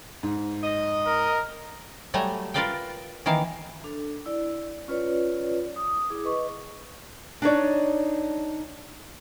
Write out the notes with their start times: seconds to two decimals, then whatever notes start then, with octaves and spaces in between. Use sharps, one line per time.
0.23 G#2
0.63 D#5
1.06 A#4
2.14 F#3 G3 A3 G#5 A#5
2.54 F4 A#4 B4 D5 F5 G5
3.26 D#3 E3 A#3 F5
3.84 D4 A4
4.26 E4 D5
4.88 C#4 F4 B4 C#5 D5
5.76 D#6
6.10 E4 G#4 D6
6.24 B4 D#5 C#6
7.42 D4 D#4 C#5 D5